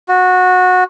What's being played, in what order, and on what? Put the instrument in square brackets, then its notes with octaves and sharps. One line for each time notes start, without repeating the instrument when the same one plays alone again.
[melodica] F#4